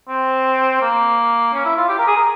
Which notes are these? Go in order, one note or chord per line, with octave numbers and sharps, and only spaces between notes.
C4
A#3
C#4
E4
F4
G4
A#4
G#4
A#4